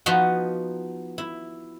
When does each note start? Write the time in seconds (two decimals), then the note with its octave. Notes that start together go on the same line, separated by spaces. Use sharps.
0.06 F3 B3 D#4 F4 F#4
1.18 E4